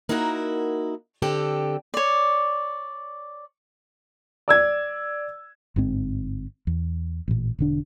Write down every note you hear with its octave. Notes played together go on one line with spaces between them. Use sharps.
A#3 D#4 E4 F#4 A#4 F#5
D3 C4 G4 A4
C#5 D5
D5 E6 G#6
G1 G#2 C4
E2
A1 A#2
E1 D3 D4